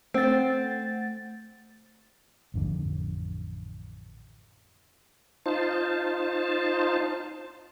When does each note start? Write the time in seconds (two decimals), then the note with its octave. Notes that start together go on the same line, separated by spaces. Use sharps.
0.14 A3 C4 F#5 A6
2.54 A1 F2 D3
5.46 D#4 F4 C5 A5